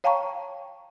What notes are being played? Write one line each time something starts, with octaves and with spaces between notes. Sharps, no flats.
C#5 F5 G5 A5 A#5 C#6